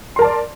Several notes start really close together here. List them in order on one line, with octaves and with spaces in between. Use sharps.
C6 A#4 A5 D5